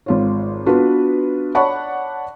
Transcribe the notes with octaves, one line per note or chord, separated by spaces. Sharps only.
G#1 F4 C#5
B3 D4 F4 F#4 B4
C#5 D5 F#5 A5 B5 C#6